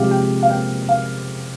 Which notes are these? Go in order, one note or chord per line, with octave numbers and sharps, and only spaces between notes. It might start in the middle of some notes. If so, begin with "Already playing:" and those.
Already playing: C3 F3 G#3 G4 F5
G5
F5
G5
F5